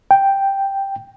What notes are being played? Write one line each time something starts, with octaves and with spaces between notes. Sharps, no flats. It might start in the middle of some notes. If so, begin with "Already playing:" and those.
G5